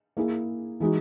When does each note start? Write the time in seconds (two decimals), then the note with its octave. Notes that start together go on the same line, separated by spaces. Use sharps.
0.17 A#3 E4 G#4
0.80 E3 G#3 D#4 F#4